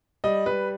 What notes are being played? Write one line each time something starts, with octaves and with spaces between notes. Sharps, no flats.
G3 D#5
G3 B4